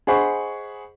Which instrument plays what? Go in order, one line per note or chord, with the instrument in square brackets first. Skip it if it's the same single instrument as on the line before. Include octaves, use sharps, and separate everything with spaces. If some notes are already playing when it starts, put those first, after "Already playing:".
[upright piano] G#4 C5 D#5 F#5 B5 C#6